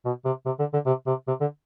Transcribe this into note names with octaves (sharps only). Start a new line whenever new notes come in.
B2
C3
C3
D3
D3
C3
C3
C3
D3